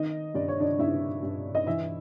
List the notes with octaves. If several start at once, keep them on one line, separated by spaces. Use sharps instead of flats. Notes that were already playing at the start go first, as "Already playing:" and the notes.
Already playing: D#3 D#4 D#5
G2 D5
C#5
D4 D5
G2 E4 E5
G2
D#5
E3 E4 E5